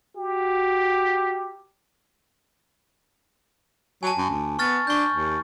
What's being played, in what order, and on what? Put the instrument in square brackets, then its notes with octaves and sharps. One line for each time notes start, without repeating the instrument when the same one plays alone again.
[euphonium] F#4 [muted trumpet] G4
[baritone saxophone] F#3 [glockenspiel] G#5 A5
[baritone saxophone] F#2
D2
[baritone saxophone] B3 [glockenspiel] C#6 F6 A6
[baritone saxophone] D4 [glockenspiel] C#6 G6
[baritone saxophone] D#2